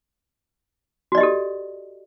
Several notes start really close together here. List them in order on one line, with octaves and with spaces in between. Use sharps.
F#4 D5 D#5 G4 A4